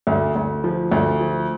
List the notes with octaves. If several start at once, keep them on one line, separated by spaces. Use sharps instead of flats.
D2
D2
F3
D2
F3